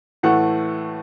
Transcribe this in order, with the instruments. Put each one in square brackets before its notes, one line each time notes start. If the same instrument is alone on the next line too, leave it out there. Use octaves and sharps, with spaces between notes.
[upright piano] A2 E3 A3 F#5